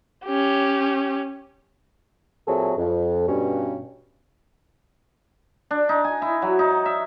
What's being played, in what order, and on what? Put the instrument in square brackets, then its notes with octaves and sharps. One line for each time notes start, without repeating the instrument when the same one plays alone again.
[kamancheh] C#4 G4
[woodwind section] A#2 F#3 C4 E4 G#4 A4
F2
G2 B2 C#4
[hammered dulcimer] D4
D#4
G#5
E4
F#3
D#4
E5